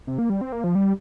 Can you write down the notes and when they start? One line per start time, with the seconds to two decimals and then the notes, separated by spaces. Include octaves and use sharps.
0.07 C3
0.19 A#3
0.30 G3
0.41 C4
0.52 A#3
0.64 F3
0.75 G3